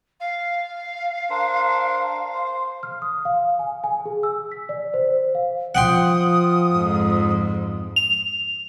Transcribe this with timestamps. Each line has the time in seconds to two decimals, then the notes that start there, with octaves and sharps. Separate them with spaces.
0.20 F5
1.30 D4 A#4 C5
2.34 C5
2.83 F6
3.02 D#6
3.25 F5
3.59 G#5
3.84 G#5
4.06 G#4
4.23 E6
4.52 B6
4.69 D5
4.94 C5
5.35 F5
5.75 F3 F#5 G5 C6 D#6
6.73 F2 G#2
7.96 F7